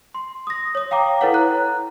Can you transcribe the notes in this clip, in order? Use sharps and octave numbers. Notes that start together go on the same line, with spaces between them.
C6
D#6 A#6
C#5 D#6
F5 G5 A#5 D6
E4 A4 B4 C#5 F#5
A#5 F#6